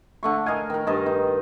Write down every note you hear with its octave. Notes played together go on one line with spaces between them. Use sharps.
D3 A3 C#6
A#4 D#5 F5 G#5
D#3 A#4
G2 D#5 A5
D#4